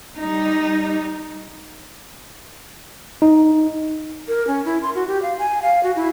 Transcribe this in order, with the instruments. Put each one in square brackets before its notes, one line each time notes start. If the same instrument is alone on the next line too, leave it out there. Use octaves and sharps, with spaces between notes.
[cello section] G3 D#4
[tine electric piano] D#4
[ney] A#4
C#4
E4
C6
F#4
G4
F5
G#5
F5
F#4
E4